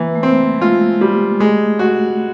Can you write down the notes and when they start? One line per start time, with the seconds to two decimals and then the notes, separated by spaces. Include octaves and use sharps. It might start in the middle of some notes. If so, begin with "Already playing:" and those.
Already playing: E3 A#3
0.15 A3
0.22 A#3 C4
0.54 G#3
0.61 A3 F4
1.01 G3
1.40 G#3 A3
1.79 F#4